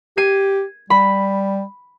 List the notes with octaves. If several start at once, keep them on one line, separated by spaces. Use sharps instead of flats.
G4 G#6 C7 D#7
G3 B5